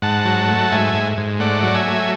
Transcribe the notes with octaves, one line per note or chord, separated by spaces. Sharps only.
G#2 F#5 A5
F#3
A3
G#2 E5 G#5
G#2
G#2
A3 D5 F#5
F#3
E5 G#5
A3